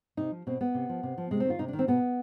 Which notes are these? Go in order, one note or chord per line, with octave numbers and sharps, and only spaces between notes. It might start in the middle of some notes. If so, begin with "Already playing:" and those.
C3 D#4
F3
B2 C4
B3
C3
F3
C3
F3
C3 G#3
C4
D#3
F4
C3 D#4
D4
D#3
C4
B2 B3